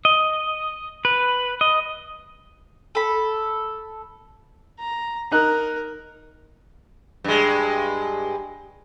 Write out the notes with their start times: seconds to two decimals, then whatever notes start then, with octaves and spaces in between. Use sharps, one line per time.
0.05 D#5
1.05 B4
1.61 D#5
2.95 A4 B5
4.79 A#5
5.32 D#4 A#4 F#6
7.24 G2 G#3